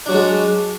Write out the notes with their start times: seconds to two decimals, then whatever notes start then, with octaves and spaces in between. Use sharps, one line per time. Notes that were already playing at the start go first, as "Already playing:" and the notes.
0.06 D4
0.09 F#3
0.11 F#4
0.14 G#3